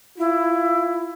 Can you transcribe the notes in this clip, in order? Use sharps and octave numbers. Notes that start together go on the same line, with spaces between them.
E4 F4